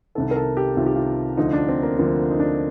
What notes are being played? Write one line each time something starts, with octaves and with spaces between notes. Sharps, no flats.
C2 C3 D#3 A4
A#4
A4
G4
C2 C3 D#3 F4
G4
F4
D2 D3 F3 D#4
D4
C4
A#3
D2 D3 F3 A#3
D#4
D4